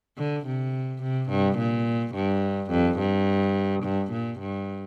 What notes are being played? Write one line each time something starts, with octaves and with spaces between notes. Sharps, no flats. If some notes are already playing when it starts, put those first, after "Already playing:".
D3
C3
C3
G2
A#2
G2
F2
G2
G2
A#2
G2